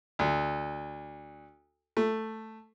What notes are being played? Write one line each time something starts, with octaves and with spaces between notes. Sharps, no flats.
D2
A3